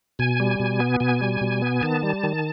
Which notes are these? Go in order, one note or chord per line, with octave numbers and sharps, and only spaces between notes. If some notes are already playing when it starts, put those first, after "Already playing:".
B2 G#5
G3
B2
B3
B2 G#5
G3
B2
B3
D#3 A5
G3
D#3